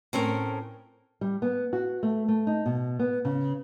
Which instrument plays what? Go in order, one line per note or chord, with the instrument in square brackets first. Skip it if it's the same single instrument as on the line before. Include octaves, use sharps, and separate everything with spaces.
[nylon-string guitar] A2 C4 C#4 A#4
G3
B3
F#4
A3
A3
D#4
B2
B3
C#3